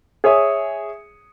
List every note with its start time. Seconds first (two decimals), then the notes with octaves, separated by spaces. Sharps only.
0.24 G#4 C#5 E5 D#6